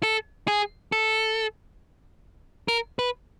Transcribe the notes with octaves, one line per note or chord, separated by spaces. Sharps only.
A4
G#4
A4
A#4
B4